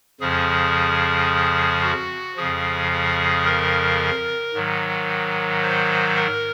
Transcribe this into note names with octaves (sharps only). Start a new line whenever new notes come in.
F2 C#3 F3 G#4
F#4
F2 C#3 F3 G#4
G#4
A#4
G#2 D#3 F#3
C5
A#4